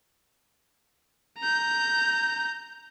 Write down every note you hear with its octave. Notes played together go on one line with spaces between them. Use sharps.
A#5 G6